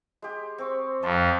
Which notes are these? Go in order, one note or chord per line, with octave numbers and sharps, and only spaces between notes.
G#3 G4
C4 C#6
F2 D#5 A5 C6